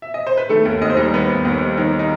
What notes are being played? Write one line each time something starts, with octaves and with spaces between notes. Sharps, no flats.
E5
D#5
C5
B4
D#3 A3 A4
D#2
D#2 D#5
C5
G3 D#4 D#5
D#3 B3 B4
D#2
D#2
G3
D#3 D#4
D#4